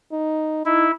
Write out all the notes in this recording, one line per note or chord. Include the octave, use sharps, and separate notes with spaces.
D#4
D#4 E4